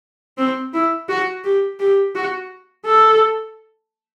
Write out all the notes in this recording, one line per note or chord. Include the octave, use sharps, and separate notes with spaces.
C4
E4
F#4
G4
G4
F#4
A4